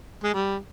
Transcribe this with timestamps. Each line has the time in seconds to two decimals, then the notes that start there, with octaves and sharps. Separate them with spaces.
0.24 G#3
0.34 G3